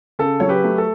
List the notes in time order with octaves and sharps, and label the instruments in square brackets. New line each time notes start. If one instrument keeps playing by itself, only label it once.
[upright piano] C#3 A4
F#3 C#5
G4 B4
A3
A4